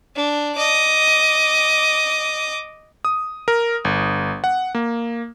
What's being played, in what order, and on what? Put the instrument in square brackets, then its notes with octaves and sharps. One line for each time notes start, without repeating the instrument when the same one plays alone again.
[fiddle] D4
D#5 D6
[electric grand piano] D#6
A#4
G1
F#5
A#3